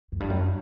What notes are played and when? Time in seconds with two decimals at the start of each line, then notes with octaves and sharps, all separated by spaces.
0.12 F#2
0.20 G2
0.30 F#2